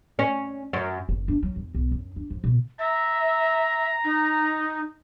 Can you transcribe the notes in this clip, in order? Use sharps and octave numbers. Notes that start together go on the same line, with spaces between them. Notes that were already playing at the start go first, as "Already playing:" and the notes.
C#4
F#2
F#1
D4
F#3
E2
B1
F#2
D4
F3
B2
E5 A#5
D#4